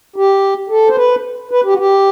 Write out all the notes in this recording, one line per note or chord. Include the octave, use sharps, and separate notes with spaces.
G4
A4
C5
B4
B4
G4
F#4
G4